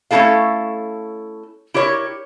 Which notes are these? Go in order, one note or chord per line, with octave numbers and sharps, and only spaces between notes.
A3 C#4 D#4 E4 A4 F5
E4 G4 A#4 C#5